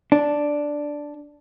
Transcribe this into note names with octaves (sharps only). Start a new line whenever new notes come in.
D4